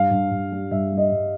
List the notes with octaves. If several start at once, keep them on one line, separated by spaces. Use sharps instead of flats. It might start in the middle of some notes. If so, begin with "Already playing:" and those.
Already playing: G2 F5
G2
G2
G3
G2 E5
G3
D#5
G2